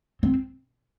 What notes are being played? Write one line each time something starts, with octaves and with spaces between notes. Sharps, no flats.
C4